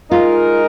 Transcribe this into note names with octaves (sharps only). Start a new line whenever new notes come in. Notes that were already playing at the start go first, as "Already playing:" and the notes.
G#3 D#4 F4 A#4